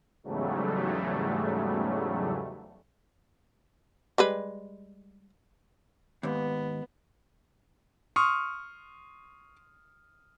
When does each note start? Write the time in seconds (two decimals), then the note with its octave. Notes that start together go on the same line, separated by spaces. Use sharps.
0.23 E2 G#2 C#3 F#3 G3 A3
4.18 G3 G#3 B4
6.23 D#2 G#2 B3
8.16 C6 C#6 D#6 F6